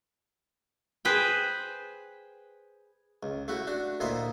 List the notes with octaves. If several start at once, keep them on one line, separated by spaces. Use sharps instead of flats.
G#4 B4 C5 G5
C#2
A3 E4 F#4
D4 F#4
D2 A#2 E4 C5 D#5